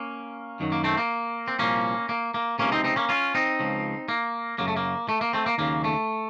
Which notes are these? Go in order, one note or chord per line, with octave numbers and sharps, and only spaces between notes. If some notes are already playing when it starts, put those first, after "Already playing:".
Already playing: A#3 C#4
F#2 D#3 F#3
A#3
A3 C4
A#3
C4
C2 A#2 F3 A#3 C#4
A#3
A#3
C#2 C3 F3 A#3 C#4
C4 D#4
C4 D#4
A#3 C#4
C#4 F4
C4 D#4
C#2 C#3 F3
A#3
F#2 C#3 F#3 A#3
A3
A#3
A3
A#3
A3 C4
A#3
D#2 C#3 F#3 A#3
A3